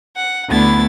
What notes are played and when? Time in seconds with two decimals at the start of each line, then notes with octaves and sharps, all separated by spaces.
0.16 F#5
0.48 D2 B3 D4 E4 A6